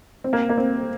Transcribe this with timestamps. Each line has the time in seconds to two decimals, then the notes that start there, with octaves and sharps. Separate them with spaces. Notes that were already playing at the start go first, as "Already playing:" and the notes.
0.24 C4
0.33 A#3
0.49 A#3
0.58 C4